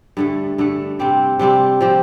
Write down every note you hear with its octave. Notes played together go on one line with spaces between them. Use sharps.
G2 D3 A3
G2 D3 A3
C3 G3 C4 G4
C3 G3 C4 G4
F3 C4 G4